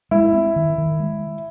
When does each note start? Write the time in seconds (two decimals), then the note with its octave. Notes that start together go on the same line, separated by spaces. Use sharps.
0.11 G#3 E4
0.33 C4
0.56 D#3
0.78 D#3
0.99 G#3